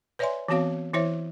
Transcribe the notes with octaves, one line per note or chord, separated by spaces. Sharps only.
B4 C#5 D5 E5 G#5 C6
E3 B3 C4 F#4 C#5 F5
E3 E4 C5 C#5 E5